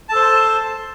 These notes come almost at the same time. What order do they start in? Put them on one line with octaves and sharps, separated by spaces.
A5 A4 C5